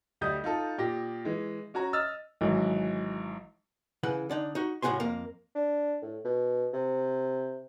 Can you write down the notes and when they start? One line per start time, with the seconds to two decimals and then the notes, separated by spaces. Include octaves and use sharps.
0.21 D2 G3 D#5 D#6 G6
0.44 D#4 F4 A4
0.78 A#2 G4 A#6
1.25 E3 G#3
1.74 C#4 F#4 C#5 A#5
1.93 D#5 E6 F6 A6
2.41 G#1 E3 F#3
4.03 C#3 E3 F#5
4.30 D3 D4 D#4
4.55 D#4 F#4
4.82 C#2 A2 D#4 F#4 G#5 C6
5.00 F2 A#3
5.55 D4
6.02 A2
6.25 B2
6.73 C3